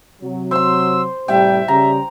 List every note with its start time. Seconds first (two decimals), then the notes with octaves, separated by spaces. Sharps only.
0.22 C3 F#3
0.51 C5 C6 E6
1.28 A2 C3 G3 E5 G5
1.68 C#3 G3 A#5